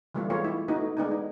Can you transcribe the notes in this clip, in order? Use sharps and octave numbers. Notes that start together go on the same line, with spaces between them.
E3 G3 A3 B3 F4
G#3 B3 F4 C#5
E4
A3 B3 D#4 F#4
G#3 B3 D4 D#4
D#4